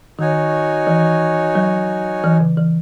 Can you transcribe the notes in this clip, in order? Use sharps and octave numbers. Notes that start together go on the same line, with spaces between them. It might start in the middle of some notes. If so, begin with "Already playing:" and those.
D#3 D#4 F#4 C#5 G#5
E3
F#3
E3
C#3
E3